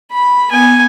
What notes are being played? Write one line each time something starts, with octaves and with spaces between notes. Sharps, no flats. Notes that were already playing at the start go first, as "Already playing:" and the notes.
B5
B3 G#5